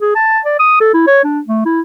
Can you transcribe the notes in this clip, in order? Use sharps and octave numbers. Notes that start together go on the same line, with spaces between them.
G#4
A5
D5
D#6
A4
E4
C#5
D4
A3
E4